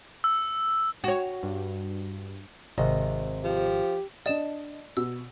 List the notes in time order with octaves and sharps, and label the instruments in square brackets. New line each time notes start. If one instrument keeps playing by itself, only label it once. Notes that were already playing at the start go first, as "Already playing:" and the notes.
[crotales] E6
[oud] F#4 C#5
[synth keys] G2
[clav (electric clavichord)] G#1 [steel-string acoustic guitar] C3 D#5
[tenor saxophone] F3 [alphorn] G4
[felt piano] D4 D#5 [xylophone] D5 E7
[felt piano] B2 [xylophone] E6